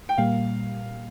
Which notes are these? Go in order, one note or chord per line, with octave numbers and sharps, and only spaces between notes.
G5
A#2 G3 A#3 F5